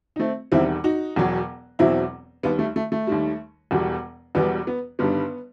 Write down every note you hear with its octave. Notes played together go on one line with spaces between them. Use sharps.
D#4
A3 C4
E1 E2 D#3 G3 C4 E4
D#4 F#4
E1 E2 B2 F#3
E1 E2 B2 F#3 C4 E4
D#2 D#3 G3 B3
A3
A3
A3
D#2 D#3 G3
E1 E2 B2 G3
E1 E2 B2 G3 B3
B3
G1 G2 D#3 G3 B3